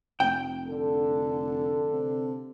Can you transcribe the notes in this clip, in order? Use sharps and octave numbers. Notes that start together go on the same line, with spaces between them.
F1 G5
D3 A4
C3